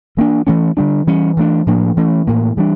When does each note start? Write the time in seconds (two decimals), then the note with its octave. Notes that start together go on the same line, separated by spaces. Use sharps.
0.17 E3 A#3 D4
0.47 E3 A3 C#4
0.77 D3 G3 D4
1.07 E3 G3 C#4
1.37 E3 A3 D4
1.67 A2 F3 A#3 D4
1.97 E3 A3 C#4
2.27 A2 E3 A#3
2.57 E3 G3 D4